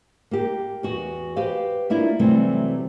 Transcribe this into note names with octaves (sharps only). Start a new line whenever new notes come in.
A#3 G4
E2 F#4
G4 B4 C5 F5
A#3 D4 E4 F4
C3 E3 F#3 G3 A3 C4